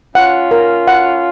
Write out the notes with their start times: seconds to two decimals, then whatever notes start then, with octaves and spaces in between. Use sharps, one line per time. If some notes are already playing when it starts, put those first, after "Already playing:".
0.14 C#4 F4 F#5
0.51 A#4
0.87 F#5